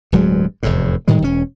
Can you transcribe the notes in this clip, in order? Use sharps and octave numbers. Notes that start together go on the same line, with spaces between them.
D1 G2 F#3 G#3
F1 E2 A2
A2 D#3 G3 G#3
E1 C#4